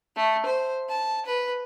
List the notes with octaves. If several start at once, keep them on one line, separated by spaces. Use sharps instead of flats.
A3
C5
A5
B4